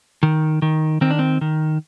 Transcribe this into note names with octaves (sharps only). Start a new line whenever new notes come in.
D#3
D#3
D#3 C4
D4
C4
D#3